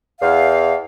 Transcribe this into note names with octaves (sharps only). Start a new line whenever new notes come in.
E2 F5